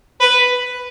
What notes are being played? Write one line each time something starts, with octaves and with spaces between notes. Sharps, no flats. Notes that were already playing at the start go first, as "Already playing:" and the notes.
B4